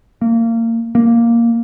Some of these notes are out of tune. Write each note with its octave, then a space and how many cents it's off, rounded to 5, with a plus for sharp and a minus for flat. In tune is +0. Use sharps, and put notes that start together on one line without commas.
A#3 -30
A#3 +0